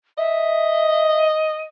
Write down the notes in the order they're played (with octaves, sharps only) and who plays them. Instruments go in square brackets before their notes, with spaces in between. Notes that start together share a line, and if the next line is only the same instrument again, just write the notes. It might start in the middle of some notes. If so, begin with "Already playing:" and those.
[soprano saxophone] D#5 [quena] E5